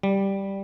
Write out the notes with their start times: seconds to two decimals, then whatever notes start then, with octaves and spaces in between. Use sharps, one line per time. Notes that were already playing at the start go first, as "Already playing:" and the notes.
0.03 G3